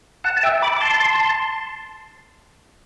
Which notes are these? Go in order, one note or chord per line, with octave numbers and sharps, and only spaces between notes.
F#5 A5
A5
E5 G5
B5 D6
D6
A5 C6